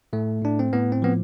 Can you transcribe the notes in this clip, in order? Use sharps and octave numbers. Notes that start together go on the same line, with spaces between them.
A2 A3
A2 D4
C4
A2 B3
C4
F3 B3